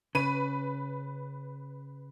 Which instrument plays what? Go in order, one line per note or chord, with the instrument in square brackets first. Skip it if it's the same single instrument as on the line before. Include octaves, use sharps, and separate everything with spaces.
[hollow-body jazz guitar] C#3 [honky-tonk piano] B4 D#7